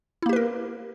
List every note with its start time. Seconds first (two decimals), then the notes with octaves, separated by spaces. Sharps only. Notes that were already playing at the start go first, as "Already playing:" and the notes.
0.22 E4
0.26 A#3
0.29 G4
0.33 B4
0.36 A#4